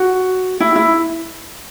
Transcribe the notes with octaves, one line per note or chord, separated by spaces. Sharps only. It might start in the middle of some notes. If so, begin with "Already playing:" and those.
Already playing: F#4
E4
E4